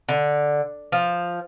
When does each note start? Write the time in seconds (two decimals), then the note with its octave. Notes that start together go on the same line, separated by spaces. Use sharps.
0.09 D3
0.92 F3